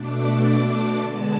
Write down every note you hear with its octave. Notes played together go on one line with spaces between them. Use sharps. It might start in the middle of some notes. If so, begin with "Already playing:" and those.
Already playing: B2 A3 D4 D6
D3 G#3 B3 A5